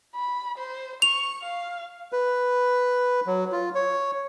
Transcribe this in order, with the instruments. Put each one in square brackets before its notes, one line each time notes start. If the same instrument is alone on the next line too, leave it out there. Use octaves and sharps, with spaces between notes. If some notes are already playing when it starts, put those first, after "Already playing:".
[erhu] B5
C5
[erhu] C#6 [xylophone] F7
[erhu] F5
[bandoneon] B4
F#3
F4
C#5